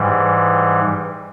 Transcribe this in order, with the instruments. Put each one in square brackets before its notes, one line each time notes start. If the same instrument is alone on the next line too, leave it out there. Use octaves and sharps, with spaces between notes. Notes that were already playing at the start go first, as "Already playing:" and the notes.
Already playing: [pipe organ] G#2 E3 G3